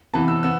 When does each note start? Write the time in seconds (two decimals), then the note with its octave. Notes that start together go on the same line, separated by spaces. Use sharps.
0.13 C3 E3 B3 A5
0.28 E6
0.43 B3 E6